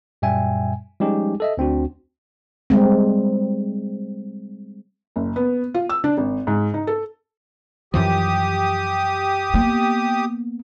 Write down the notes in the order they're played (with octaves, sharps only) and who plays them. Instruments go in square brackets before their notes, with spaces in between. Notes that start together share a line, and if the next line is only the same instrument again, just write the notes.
[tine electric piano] F#2 A#2 G3 E5 G5 G#5
F3 G3 G#3 C#4 D#4 G4
A4 D#5 E5
D2 C4 D4 F#4
[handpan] G3 G#3 C4
[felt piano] F#1
B3
F4
E6
D4
G#1
G#2
D#4
A4
[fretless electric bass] F#2 E3 F3 [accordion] G4 D#6
[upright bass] A#3 B3